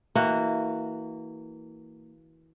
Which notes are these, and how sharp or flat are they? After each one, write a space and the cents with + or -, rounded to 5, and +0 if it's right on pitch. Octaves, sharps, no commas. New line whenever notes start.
E3 -25 A#3 -25 F#4 +0